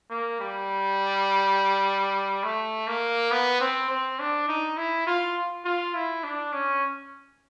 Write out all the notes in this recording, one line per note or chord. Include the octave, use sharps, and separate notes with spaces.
A#3
G3
A3
A#3
B3
C4
C4
D4
D#4
E4
F4
F4
E4
D4
C#4